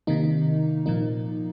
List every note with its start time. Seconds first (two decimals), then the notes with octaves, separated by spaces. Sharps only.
0.07 C3 D#3 A#3 D#4
0.86 A#2 F3 A#3 D#4